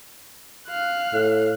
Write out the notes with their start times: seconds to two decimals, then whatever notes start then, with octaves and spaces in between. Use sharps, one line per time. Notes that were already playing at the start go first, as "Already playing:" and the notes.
0.68 F5 F#6
1.14 A2